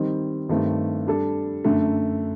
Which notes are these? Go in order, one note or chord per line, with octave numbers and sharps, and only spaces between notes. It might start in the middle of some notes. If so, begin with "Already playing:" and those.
Already playing: D#3 G3 C4 D#4
G2 D#3 A3 C4 G4
G3 D4 A4
F#2 D3 A3